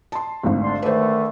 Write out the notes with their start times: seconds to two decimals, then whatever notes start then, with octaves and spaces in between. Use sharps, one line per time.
0.12 A5 C6
0.43 G#1 D2
0.62 D4 C6
0.82 D3 D#3 A3 B4 C5